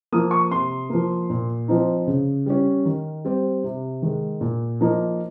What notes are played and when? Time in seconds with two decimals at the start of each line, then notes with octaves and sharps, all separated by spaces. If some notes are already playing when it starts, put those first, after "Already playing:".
0.12 F3 A#3 D#6
0.31 C#6
0.51 C3 C6
0.90 F3 A#3
1.30 A#2
1.68 F3 C4 D#4
2.07 C#3
2.46 G3 C#4
2.85 D#3
3.25 G3 C4
3.64 C3
4.02 D#3 G#3
4.41 A#2
4.81 F3 A#3 D#4